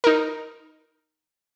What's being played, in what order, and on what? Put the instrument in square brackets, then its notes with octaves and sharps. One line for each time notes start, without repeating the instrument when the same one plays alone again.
[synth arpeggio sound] D#4 A#4